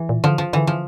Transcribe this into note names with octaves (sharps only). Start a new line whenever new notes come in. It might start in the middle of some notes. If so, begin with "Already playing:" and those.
Already playing: E3
A#2
D3 F3
F3
D3 E3
F3